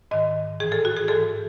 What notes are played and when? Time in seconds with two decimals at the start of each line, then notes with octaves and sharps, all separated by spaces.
0.11 G#2 D#3 D#5
0.60 A2 E3 G#4
0.72 A4
0.85 F#4
0.96 G#4
1.08 G#2 E3 A4